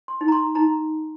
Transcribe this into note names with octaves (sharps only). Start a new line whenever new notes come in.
C6
D#4
A#5
C6
D#4 A#5